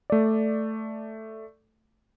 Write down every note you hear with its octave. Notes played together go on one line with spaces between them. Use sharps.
A3 D5